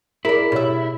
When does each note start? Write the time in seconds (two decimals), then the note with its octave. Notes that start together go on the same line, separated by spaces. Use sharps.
0.25 E4 G#4 A#4 D5
0.52 B2 G4 G#4 C#5 E5